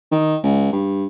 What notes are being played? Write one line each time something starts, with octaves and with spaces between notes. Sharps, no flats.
D#3
C#2
G2